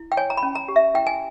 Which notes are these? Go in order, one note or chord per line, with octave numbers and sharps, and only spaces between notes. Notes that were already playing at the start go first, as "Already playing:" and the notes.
Already playing: E4
G5
C#5 G#5
A#5
B5
C#4
A#5
G4
E5
E4 G5
G#5